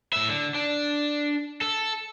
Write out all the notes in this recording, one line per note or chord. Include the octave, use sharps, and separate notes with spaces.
A2 E5
D3
D4
A4